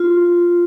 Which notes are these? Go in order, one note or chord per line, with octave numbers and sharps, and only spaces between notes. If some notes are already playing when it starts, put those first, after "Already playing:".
Already playing: F4